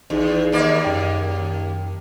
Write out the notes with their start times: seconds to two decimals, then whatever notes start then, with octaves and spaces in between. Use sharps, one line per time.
0.10 A#1 E2 D#4 G#4
0.52 D#2 A#3 D5
0.85 F#2 G5